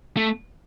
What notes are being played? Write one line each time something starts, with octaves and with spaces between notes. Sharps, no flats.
A3